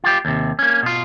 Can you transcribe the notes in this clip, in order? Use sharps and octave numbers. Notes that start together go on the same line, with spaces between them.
F4 G4
D#2 C3
A#3 C#4
B2 F4